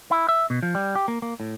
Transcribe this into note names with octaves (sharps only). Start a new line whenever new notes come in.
E4
E5
B2
F3
G3
G4
A#3
A#3
A2